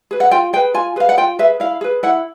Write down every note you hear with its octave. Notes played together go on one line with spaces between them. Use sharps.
G#4 B4
F#5
F4 G5
G#4 B4 G5
F4 G#5
G#4 B4 F5
F#5
F4 G5
G#4 B4 E5
E4 F5
G#4 B4
E4 F#5